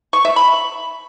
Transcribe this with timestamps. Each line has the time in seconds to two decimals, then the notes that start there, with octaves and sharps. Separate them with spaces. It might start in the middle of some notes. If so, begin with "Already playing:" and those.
0.13 C#6
0.25 E5
0.36 B5